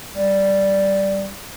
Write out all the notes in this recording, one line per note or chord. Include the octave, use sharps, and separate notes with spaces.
G3